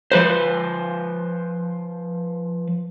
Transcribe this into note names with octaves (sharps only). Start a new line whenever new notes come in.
F3 B4 C5